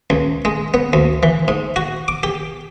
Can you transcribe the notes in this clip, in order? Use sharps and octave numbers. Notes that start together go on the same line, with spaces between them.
C#2
G#3
B3
D2
E3
G#2
F#4
D6
G4